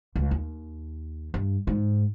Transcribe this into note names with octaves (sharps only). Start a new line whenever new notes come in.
C#2
D#2
G2
G#2